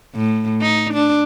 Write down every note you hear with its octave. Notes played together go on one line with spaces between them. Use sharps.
A2
D#4
D4